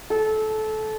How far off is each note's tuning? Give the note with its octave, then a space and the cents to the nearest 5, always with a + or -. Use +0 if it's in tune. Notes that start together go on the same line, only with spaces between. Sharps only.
A4 -20